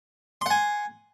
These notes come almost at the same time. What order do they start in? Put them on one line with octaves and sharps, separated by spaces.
C6 F#5 G#5